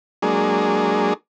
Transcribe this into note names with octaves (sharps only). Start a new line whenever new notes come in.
F#3 G#3 A#3 D4 G#4